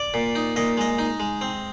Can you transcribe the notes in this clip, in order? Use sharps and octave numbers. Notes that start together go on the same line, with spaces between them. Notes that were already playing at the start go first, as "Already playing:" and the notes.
Already playing: D5
A#2
D#4
A#2 D#5
G#3 D#5
D#4
G#3
C4